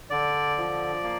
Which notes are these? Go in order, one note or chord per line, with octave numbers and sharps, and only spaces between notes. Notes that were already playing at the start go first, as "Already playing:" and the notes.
D3 D5
F3
A#3